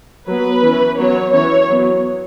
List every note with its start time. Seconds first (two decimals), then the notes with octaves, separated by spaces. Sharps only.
0.28 F#3 B3 B4
0.63 E3 C#4
0.98 F#3 B3 C#5
1.33 E3 C#4 C#5
1.68 F#3 B3